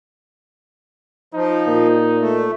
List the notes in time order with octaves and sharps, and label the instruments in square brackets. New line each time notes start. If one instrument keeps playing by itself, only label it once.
[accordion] F3 [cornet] D#4
[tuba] A#2
[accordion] A3